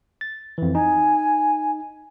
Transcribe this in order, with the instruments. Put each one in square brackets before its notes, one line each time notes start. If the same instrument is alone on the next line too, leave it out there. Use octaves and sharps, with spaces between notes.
[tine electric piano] A6
F2 E3
[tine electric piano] D#4 [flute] G#5